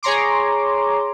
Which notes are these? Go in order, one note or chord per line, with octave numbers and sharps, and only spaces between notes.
G#4 C#5 A#5 C6 D6